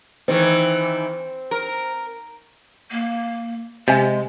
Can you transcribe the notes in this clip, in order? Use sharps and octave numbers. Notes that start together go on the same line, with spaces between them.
D#3 E3 C4
A#4
A#3
C3 G#3 D#5 F5 G#5